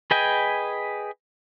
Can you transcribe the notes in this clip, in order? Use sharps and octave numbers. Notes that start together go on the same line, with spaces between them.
G#4 B4 D#5 G5 G#5